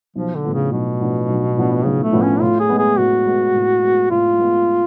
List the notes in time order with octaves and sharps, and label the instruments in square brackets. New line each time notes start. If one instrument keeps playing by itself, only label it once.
[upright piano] B1 [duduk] F3
[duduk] D3
[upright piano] A2 F3 B3 D4
[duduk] C#3
[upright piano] B1 [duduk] B2
[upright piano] A2 F3 B3 D4
B1
A2 F3 B3 D4
[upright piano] B1 [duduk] C#3
[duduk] A3
[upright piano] A2 F3 B3 D4
[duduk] C#4
[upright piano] A2 [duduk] F4
[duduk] G#4
[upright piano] G#3 B3
[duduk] G#4
[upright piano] A2 [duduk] F#4
[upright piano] G#3 B3
A2
G#3 B3
[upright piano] A2 [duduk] F4
[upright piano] G#3 B3